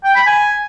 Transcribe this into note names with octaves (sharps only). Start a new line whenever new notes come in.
G5
B5
G#5